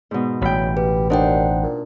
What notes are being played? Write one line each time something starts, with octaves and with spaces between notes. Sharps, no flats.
G#2 B2
A1 F#3 G5 B5
G4 B4
D#2 D4 D#4 C5 F#5 G5
A#2